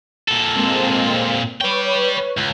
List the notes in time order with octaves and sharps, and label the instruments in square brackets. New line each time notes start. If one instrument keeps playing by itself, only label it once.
[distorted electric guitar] A#2 A4
[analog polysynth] G#3 A#3 C4
[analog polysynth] B4 C#5 [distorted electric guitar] D5 G5
[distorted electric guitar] C#2